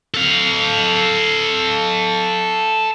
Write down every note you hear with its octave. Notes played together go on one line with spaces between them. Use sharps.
A4 F5